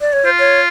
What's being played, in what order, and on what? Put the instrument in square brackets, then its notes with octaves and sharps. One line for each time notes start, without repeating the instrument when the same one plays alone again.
[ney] D5
C#5
[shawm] F4 [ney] C5
[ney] C#5